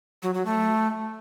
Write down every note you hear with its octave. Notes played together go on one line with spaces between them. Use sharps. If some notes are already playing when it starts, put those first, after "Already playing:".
F#3
F#3
A3